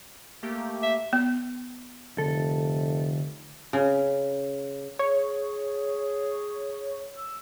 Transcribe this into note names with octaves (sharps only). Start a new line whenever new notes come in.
A3 A#3 G4
E5
B3
F1 D3 A4
C#3
G#4 C#5
E6